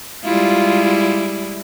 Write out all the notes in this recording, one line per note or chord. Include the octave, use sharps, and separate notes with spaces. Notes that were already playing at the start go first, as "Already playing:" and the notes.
G3 G#3 E4 F4